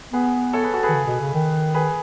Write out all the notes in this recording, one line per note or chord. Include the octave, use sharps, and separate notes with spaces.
B3 G#4 B4
A4 C#5
G#4 B4
F#4 A4
G#4 B4
D#3
C#3
B2
C#3
D#3
G#4 B4